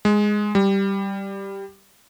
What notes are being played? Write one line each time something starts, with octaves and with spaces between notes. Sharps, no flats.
G#3
G3